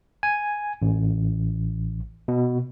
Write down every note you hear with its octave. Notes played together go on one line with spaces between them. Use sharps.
G#5
A1
B2